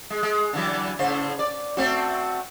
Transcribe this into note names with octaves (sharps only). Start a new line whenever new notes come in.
G#3
G#3
D3 E3 F#3
A2 C#3 C5
D5
A3 C4 F#4